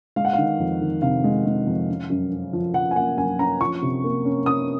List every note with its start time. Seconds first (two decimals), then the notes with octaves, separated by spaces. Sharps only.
0.16 G#3 F5
0.25 F#5
0.33 D#3 F5
0.59 F2
0.81 D#3
1.02 C3 F5
1.24 G#3
1.45 G#3
1.67 F2
1.89 C#4
2.10 F#2
2.32 C#4
2.53 F3
2.74 F3 F#5
2.91 G#5
2.96 A#3 F#5
3.17 F#2 G#5
3.39 C#4 A#5
3.61 F3 C#6
3.82 C3
4.04 A#3
4.25 C#4
4.46 C#4 D#6